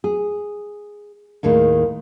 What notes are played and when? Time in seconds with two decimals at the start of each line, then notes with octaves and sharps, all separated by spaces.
0.04 G#4
1.43 D#2 A2 D#3 G#3 D#4